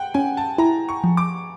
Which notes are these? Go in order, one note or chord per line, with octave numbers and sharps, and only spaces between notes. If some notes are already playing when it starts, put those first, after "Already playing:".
Already playing: F#5 G5
C#4 G#5
A5
E4 A#5
C#6
F3
D6